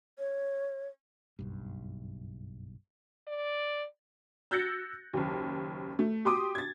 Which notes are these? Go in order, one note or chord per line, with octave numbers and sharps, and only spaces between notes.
C#5
F#1 B1 G2
D5
E6 F#6 G6 A6 A#6 C#7
F#1 D#2
A3
G4 C6 D6 D#6
G#6 A6